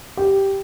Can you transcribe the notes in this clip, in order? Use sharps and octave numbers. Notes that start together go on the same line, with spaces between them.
G4